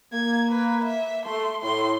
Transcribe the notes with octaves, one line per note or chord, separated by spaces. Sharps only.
A#3 G#6
B4
E5
A3 C6
A2 C6